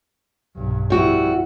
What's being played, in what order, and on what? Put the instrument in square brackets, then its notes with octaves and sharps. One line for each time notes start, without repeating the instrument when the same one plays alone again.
[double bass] B1 G2
[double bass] F2 E4 [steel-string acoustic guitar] G3 F#4